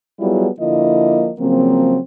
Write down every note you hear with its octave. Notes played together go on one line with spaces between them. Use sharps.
F#3 G3 B3 E4 F4 G#4
D3 F3 A#3 E4 F4 D#5
C#3 F3 F#3 A#3 C4